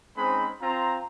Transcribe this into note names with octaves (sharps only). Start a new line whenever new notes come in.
G#3 C4 C#4 D#4 C5 B5
C4 F4 C5 A#5